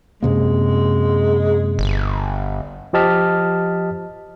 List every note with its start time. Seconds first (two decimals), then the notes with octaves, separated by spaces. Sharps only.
0.22 F#2 C3 G#3 A#3
1.79 G1
2.93 F3 G4 D#5 A5 F6 B6